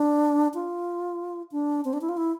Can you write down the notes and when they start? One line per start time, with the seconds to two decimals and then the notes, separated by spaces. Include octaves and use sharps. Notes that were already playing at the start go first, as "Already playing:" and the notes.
Already playing: D4
0.54 F4
1.52 D4
1.85 C4
1.93 D4
2.01 E4
2.09 F4
2.17 E4